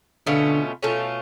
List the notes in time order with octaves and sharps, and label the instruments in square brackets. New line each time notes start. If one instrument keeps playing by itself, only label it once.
[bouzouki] B2 A3 C#4 F4 [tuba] D3
[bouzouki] B2 A3 C#4 F4